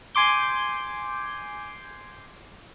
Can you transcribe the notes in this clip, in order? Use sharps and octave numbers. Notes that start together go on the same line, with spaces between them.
G#5 C6 D6 G6